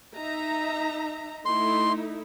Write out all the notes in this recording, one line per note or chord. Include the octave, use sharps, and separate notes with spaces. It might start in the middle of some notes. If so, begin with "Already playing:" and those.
D#4 E5 A#5
A3 D#4 E4 C6